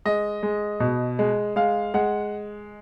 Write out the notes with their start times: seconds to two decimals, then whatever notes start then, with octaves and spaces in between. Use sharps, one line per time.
0.05 G#3 D#5
0.43 G#3
0.80 B2
1.19 G#3
1.56 G#3 F5
1.94 G#3 F#5